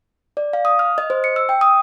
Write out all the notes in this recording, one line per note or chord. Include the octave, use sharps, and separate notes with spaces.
D5
F5
D#6
F6
D#5
C5
C#7
E6
G5
D#6